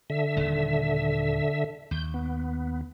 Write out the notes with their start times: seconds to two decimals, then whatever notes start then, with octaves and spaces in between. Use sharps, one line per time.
0.10 D3 E5
0.36 D#1 A#2 D#3
1.91 D#2 G6
2.14 B3